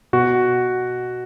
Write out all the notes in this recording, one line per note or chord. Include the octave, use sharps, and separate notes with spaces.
B2 F#4